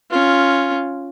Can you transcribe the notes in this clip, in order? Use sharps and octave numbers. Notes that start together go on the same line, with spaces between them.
C#4 F4